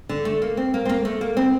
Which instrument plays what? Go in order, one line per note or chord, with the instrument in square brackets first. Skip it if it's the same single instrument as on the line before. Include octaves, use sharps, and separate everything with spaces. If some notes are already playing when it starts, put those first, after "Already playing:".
[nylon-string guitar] D3
A3
A#3
C4
A#3
C4
A#3
A3
A#3
C4